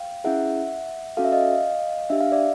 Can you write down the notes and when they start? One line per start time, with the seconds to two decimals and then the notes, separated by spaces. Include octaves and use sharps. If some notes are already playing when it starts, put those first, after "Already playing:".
Already playing: F5 G5
0.24 C#4 E4 G#4 E5 F#5
1.17 C#4 F#4 A4 F5
1.25 E5
1.32 D#5 F5
2.10 D4 G4 E5
2.20 F5
2.32 D5 E5